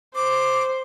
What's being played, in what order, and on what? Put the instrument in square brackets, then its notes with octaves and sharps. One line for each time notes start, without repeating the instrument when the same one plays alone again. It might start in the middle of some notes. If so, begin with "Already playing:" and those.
[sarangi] C5 [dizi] D6